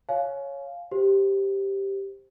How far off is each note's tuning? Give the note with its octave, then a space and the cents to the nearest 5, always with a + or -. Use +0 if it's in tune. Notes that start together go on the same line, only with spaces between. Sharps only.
C#5 +0 F5 +0 G#5 +35
G4 +0 C5 +0